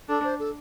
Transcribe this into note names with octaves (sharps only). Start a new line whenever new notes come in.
D4 A4
C5
A4